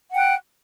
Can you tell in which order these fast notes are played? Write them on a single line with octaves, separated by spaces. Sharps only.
F#5 G5 F#6